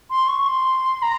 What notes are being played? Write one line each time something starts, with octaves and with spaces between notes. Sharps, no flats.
C6
C#6
C6
A#5